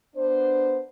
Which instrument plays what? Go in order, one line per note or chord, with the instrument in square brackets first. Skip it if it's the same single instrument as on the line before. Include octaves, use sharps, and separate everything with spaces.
[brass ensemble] B3 D4 C5